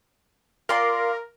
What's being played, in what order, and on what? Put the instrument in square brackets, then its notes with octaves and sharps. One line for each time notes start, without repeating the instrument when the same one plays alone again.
[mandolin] F4 D5 C6 [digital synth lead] A#4